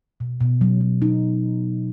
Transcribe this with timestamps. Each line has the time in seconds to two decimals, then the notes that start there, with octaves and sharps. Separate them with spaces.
0.20 B2
0.40 B2
0.61 F#3
0.81 F#3
1.02 D#4